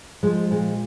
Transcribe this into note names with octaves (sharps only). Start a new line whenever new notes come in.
F3 G#3
A#2 G#3